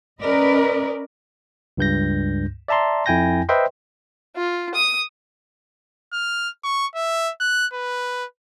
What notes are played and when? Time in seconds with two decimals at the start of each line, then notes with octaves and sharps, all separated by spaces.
0.21 C#4 A#4 B4 D5 D#5
1.77 C#2 G2 G6 A#6
2.68 D5 E5 A5 A#5 C6
3.06 F2 E4 G5 G#5 G6 A#6
3.49 B4 C5 D#5 E5 G5 C6
4.35 F4
4.74 D#6
6.13 F6
6.64 C#6
6.95 E5
7.40 F#6
7.73 B4